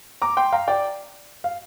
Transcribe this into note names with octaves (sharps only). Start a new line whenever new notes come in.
A#5 D6
G5 C6
F5 A#5
D5 G5
F5